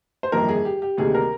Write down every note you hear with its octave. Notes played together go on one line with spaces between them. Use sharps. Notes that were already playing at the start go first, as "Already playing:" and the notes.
C5
G1 F2 D#3 A#3 A#4
G#4
G4
G4
D2 C3 D#3 G3 A#3 G#4
A#4